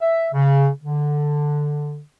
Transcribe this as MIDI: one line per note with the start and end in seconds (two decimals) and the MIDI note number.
0.01 0.28 76
0.33 0.68 49
0.83 2.00 50